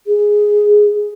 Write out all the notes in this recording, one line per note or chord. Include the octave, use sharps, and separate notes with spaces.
G#4